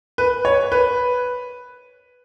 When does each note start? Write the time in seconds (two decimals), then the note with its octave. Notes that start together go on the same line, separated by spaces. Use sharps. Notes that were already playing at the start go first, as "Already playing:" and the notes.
0.18 B4
0.45 C#5
0.72 B4